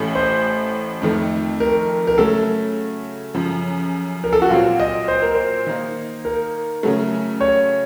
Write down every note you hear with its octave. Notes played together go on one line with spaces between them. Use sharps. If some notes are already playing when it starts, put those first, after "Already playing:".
Already playing: A1 A2 A3 C#4 A4
C5
F2 D#3 A3
A#4
A#4
C#3 F#3 A3 A4
F#2 C#3 F3
A#4
A4
F#4
A#2 F#3 C4 F4
D#5
C5
A#4
C5
D#3 A#3 D#4
A#4
C#3 F#3 A3
C#5